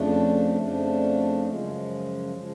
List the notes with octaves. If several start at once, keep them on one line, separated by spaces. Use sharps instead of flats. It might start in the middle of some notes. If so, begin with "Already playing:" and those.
Already playing: F2 C#3 F3 A3 D4
F2 C#3 F3 A3 D4
F#2 C#3 F3 G#3
C#3 F3 G#3